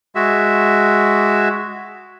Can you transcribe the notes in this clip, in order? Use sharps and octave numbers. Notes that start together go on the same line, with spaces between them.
G#3 F#4 E5